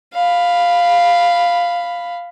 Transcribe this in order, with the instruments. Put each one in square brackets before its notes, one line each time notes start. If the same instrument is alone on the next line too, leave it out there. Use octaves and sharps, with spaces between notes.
[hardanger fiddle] F5 B5